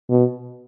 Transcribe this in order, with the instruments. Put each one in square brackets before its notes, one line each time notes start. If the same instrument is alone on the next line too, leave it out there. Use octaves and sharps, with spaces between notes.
[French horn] B2